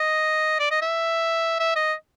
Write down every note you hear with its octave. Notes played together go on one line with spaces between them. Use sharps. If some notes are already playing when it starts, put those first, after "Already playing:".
Already playing: D#5
D5
D#5
E5
E5
D#5